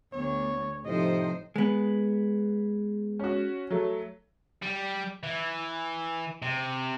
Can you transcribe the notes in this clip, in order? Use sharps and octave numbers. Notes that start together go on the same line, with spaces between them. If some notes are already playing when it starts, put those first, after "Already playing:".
D2 B3 C#5
A2 C3 F3 D#4 C5 D#5
G#3 B3
C#4 F#4
F#3 A3
G3
E3
C3